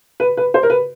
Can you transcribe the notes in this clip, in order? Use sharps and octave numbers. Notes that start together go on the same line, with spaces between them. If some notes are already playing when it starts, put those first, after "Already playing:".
B4
B4
C5
A#4
B4